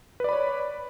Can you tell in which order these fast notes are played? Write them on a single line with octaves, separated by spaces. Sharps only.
B4 D5 B5 C#5